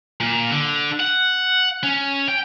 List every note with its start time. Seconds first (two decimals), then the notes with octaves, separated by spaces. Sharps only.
0.20 A#2
0.51 D3
1.00 F#5
1.83 C#4
2.28 G5